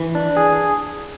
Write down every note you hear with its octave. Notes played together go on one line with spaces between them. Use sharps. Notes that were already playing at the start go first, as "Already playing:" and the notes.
Already playing: E3
D4
G#4